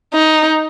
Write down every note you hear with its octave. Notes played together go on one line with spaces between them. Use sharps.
D#4